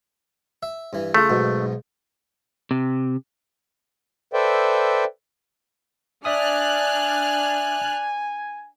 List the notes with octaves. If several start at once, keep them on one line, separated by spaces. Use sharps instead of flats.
E5
G2 E3
C#3 A3 F4
B1 G#2 B2
C3
A4 B4 C5 D5 E5 G5
D4 D5 E5 G#5 D#6 F6 F#6